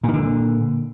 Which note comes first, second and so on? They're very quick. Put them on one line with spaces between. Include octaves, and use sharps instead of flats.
A#2 D#3 D3